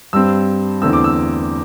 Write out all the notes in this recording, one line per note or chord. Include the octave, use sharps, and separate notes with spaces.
G2 G3 C4 E6
E2 D3 A3 C4 E6
D6
E6